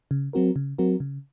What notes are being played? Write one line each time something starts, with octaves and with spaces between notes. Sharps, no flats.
C#3
F#3 C4 F#4 A#4
C#3
F#3 C4 F#4 A#4
C#3